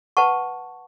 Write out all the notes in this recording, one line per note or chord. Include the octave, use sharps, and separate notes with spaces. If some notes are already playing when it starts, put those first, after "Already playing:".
B4 F#5 A5 C#6